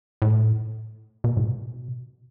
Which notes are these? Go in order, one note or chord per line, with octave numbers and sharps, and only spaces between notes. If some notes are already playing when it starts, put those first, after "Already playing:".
A2
B2
A2
B2